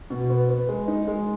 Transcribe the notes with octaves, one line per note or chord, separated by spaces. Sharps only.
B2
B3
B3
G#3
D#4
G#3